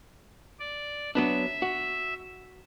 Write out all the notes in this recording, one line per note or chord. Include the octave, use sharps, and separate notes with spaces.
D5
F#3 B3 D4 E5
F#4